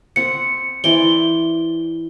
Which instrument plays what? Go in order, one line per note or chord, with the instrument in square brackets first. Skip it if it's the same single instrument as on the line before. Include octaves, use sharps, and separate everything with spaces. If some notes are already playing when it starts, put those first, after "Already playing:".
[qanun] C4 F#5 [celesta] C#7
[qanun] E3 C4 D5 [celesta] G7